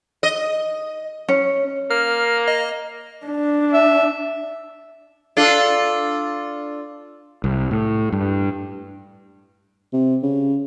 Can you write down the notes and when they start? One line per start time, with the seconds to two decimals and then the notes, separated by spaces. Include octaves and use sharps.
0.23 D#5
1.29 C#4
1.91 A#3 F6
2.48 D#5
3.26 D4
3.73 E5
5.37 D4 F4 A4
7.44 C2
7.71 A2
8.12 G2
9.93 C3
10.23 C#3